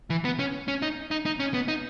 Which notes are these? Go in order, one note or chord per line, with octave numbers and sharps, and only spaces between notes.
E3
B3
C#4
C#4
D#4
D#4
D#4
C#4
B3
D#4